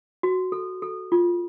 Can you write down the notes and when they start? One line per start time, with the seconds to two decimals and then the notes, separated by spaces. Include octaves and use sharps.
0.23 F#4
0.52 A4
0.82 A4
1.12 F4